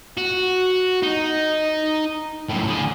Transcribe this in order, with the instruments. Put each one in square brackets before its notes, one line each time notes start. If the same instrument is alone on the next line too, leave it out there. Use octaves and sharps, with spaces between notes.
[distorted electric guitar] F#4
D#4
F#2 A2
D3 G#4